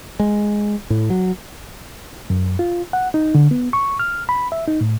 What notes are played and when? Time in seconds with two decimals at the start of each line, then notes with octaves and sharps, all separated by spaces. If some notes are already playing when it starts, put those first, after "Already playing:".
0.20 G#3
0.90 A2
1.10 F#3
2.30 F#2
2.59 F4
2.93 F#5
3.14 D#4
3.35 D3
3.51 B3
3.73 C#6
4.00 F6
4.29 B5
4.52 E5
4.68 D#4
4.81 A2